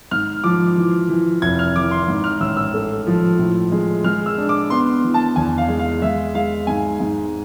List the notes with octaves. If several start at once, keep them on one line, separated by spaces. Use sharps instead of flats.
G#2 F6
F3 D6
E3
E3
F1 G#6
F6
E3 D6
C6
G#2
F6
A1 E6
E6
A3
F3
A2
G#3
G#3 F6
E6
D4
D6
B3 C6
E3
A5
E2 G#5
F5
G#3
F5
G#3 E5
G#3 F5
G#2 G#5
G#2